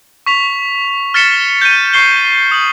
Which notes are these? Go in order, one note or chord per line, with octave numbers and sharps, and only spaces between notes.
C#6 B6 F7
F6 A6 B6 C#7 E7 G7
G6 D#7
C#6 C7 G7
D#6 F#7